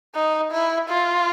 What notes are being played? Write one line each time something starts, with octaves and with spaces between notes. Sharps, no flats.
D#4
E4
F4